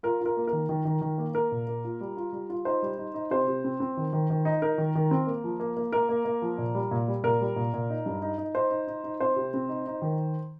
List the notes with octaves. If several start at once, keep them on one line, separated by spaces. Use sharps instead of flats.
F4 A#4
F4 A#4
A#3
A#4
D#3
D#3
D#3
D#3
A#3
A#3 A#4
A#2
A#3
F4
G3
F4
G3
F4
D#4 C5
G3
D#4
D#4
C3 C5
C3
C4
C4
D#3
D#3
D#3
D#4
D#4 A#4
D#3
D#3
C4
A#3
F3
A#3
A#3
A#3 A#4
A#3
A#3
F3
A#2
G3
A#2
G3
A#2 A#4
G3
A#2
A#2
D#4
G2
D#4
D#4
D#4 C5
D#4
D#4
D#4
C4 C5
C3
C4
D#4
D#4
D#3